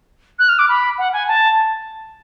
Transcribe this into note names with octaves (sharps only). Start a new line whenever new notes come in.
F#6
F6
D6
B5
F#5
G#5
A5